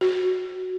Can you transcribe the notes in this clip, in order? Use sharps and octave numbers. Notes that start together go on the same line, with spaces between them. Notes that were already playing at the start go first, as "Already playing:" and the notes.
F#4